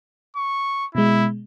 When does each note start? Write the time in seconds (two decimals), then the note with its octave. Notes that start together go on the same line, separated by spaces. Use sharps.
0.36 C#6
0.95 B2 G#3 E4